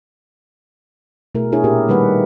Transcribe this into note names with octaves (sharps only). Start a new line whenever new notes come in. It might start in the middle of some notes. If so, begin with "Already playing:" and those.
B2 A3 E4 G#4 A#4
D4 E4 G#4 C#5
A#2 G4 A#4
D#3 G3 A#3 D#4 B4 F#5